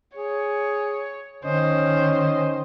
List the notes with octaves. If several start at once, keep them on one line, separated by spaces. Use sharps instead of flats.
G#4 C#5
D#3 C#4 C5 D#5